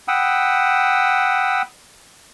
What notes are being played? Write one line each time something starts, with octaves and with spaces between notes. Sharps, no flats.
F#5 G5 B5 D#6 E6